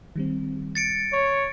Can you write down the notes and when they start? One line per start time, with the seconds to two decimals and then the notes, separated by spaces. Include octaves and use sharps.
0.16 D#3 G3 C4
0.75 A6 C#7 D7
1.13 C#5